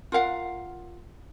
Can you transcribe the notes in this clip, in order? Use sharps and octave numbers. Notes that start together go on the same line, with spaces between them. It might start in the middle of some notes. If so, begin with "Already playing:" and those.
F4 A#4 F5 F#5